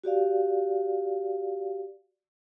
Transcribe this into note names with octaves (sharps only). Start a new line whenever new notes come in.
F#4 G4 D5 F5